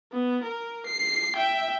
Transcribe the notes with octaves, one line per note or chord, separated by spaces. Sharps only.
B3
A#4
C7
E5 G5